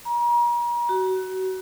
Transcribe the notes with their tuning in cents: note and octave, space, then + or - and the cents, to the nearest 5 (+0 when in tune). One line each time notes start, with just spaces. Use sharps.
A#5 +40
F#4 +25